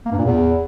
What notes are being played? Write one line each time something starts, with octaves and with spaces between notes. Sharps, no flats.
A#3
G2
A#2
E2